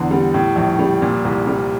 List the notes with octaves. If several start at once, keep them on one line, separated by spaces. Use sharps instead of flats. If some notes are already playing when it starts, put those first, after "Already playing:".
Already playing: E2 D3
G3
A2
A#1
G3
A#2
C2
G3